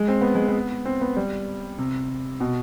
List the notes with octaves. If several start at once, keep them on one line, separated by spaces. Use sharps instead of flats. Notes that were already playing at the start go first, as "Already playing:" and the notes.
Already playing: G#3
C4
B3
G#3
B3
C4
B3
G3
C3
B2